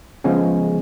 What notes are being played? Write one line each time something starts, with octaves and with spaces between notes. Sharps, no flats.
C#3 F3 G#3 B3 C#4